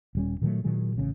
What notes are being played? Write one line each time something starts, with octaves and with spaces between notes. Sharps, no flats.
D#1 G3 C#4
A#2 D#3 F#3 A3
A#2 D#3 F#3 G#3
A1 C#3 G#3 C#4